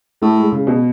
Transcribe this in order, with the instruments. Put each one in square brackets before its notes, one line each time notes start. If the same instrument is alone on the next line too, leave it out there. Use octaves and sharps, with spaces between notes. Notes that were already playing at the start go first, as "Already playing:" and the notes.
[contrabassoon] A2 [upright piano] A3
[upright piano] G#3
C#3
B2